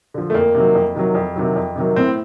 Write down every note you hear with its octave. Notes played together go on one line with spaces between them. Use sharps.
D3 F3
A3
F2 A#3
C3 D#3 F#3
F2
C3 D#3 F#3
F2
C3 D#3 F#3
F2
C3 D#3 F#3
A2 C4